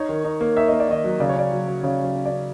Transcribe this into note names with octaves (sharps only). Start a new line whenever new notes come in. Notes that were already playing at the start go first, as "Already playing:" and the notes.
Already playing: D#4 C#5
D#3
D#4
A#3
D#4 E5
A#3 D#5
D5
D#3 D#5
F#3
C#3 D5
C#5
C#4 D5
F#3
F#3
C#3 C#5
F#3 C#5
C#4
D5
C#4